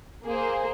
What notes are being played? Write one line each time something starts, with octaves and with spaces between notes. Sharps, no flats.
A#3 G#4 C5